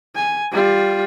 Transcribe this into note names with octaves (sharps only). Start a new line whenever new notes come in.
G#5
G3 F4